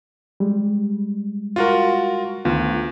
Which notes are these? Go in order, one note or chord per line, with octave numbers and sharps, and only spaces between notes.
G3 G#3
F4 F#4 A#4
D2 D#3 B3 F4